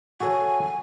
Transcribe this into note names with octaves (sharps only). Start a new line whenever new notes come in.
F#4 A4 C#5 G#5